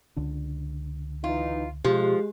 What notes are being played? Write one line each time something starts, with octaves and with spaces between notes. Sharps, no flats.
C#2 D3 D4
E3 D#4 F4
B2 F3 G#3 G4